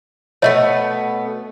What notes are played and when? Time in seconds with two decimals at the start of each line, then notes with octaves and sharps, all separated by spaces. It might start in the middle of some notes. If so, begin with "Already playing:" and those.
0.42 B2 A3 B3 C#5 D#5 E5